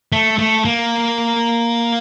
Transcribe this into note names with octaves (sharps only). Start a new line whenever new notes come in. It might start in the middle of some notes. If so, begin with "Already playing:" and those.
A3
A3
A#3